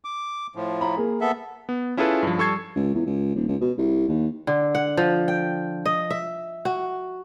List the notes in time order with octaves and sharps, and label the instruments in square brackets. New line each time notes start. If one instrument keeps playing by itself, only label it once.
[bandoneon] D6
A2 F3
[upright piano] A#5 B5
A#3 G#4
[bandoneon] B3 A4 E5
[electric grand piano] B3
C#4 E4 F4 G#4 A4 B4
G2 F3
G3 A4 C#6 E6 G#6 C7
[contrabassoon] C#2
E2
C#2
D#1
C#2
B2
C2
D#2
[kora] D3
F#5
F3
G5
D#5
E5
F#4